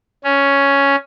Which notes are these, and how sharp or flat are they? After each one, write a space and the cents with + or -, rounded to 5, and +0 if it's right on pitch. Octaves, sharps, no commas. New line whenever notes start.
C#4 +5